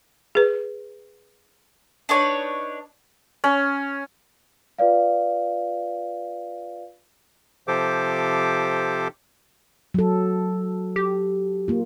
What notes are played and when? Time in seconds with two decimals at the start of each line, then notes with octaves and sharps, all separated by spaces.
0.35 G#4 B4
2.09 D4 D#4 B4 C#5
3.44 C#4
4.78 F4 B4 D5 F5
7.68 C3 F3 G4 A4 C5 D6
9.94 F#3 A4
10.96 G4
11.68 A#3 F4